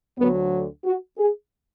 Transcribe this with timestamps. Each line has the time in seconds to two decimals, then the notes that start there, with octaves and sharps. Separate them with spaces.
0.18 D2 D3 F#3 B3
0.85 F#4
1.18 G#4